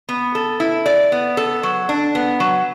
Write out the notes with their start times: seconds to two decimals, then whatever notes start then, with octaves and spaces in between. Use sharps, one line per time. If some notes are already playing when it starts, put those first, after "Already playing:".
0.09 B3
0.35 A4
0.60 E4
0.86 D5
1.12 B3
1.37 A4
1.63 F#3
1.89 D4
2.15 B3
2.40 F#3